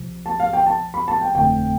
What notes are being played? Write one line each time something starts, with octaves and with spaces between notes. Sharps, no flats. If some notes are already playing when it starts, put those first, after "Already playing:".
Already playing: C2 C3 F3
A5
F5
G5
A5
B5
A5
G5
G1 F2 D3 A3 C4 G5